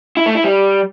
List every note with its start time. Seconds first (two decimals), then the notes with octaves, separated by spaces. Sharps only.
0.17 E4
0.26 A3
0.35 E4
0.44 G3